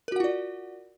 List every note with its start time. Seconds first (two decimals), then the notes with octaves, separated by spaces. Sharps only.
0.08 A#4
0.12 F#4
0.16 F#5
0.20 F4
0.24 D5